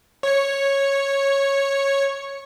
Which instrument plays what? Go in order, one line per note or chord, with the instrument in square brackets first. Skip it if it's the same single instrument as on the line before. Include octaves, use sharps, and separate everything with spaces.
[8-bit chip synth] C#5 C#7